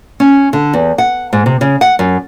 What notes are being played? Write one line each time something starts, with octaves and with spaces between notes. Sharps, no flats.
C#4
D3
E2
F#5
G#2
C3
C#3
F#5
F#2